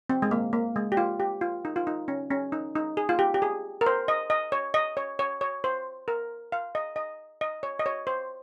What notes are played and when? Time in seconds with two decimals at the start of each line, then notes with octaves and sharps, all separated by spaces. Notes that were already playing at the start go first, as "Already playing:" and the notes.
0.10 C4
0.22 G#3
0.31 A#3
0.53 A#3
0.76 G#3
0.92 G4
0.97 F4
1.20 G4
1.41 F4
1.65 D#4
1.76 F4
1.87 D#4
2.08 C#4
2.31 C#4
2.52 D#4
2.76 D#4
2.97 G#4
3.09 F4
3.19 G4
3.34 G4
3.42 G#4
3.81 A#4
3.86 C5
4.08 D#5
4.30 D#5
4.52 C#5
4.74 D#5
4.97 C#5
5.19 C#5
5.41 C#5
5.64 C5
6.08 A#4
6.52 F5
6.75 D#5
6.96 D#5
7.41 D#5
7.63 C#5
7.79 D#5
7.86 C#5
8.07 C5